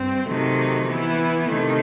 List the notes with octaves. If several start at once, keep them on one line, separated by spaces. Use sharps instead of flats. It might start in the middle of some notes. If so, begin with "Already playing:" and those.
Already playing: G2 C4
C3 D#3 F#3 A3
E3 B3 E4
C3 D#3 A3